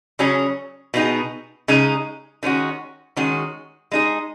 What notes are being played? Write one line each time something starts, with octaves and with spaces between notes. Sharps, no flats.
C#3 F#3 C#4 G#4
B2 B3 D#4 G#4
C#3 G#3 D#4 G#4
D#3 G#3 C#4 F#4
D#3 G#3 C#4 F#4
G#3 D#4 G#4